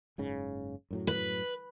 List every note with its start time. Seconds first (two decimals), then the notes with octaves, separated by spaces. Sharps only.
0.18 F#1 G#2 C#3
0.91 F#2 A2 F#3
1.07 B4